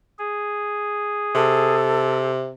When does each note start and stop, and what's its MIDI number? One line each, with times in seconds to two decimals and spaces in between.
0.19 1.75 68
1.35 2.52 48
1.35 2.30 69